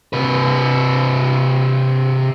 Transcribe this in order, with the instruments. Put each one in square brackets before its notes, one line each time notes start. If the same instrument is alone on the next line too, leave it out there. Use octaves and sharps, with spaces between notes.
[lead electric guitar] C3 B4